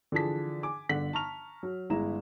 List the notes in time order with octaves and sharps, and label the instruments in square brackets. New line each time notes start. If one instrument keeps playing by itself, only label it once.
[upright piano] D3 E3 F3 G#4 A5 B6
G#5 D6
G1 D3 F#5 B6 F#7
A5 A#5 C#6 F6 F7
F#3
G1 G#3 E4 A#5 E7